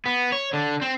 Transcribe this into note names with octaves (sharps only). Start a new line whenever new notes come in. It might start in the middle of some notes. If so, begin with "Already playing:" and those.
B3
C#5
D3
C4